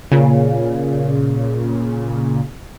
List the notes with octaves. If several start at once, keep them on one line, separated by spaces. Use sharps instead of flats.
A#2 C#3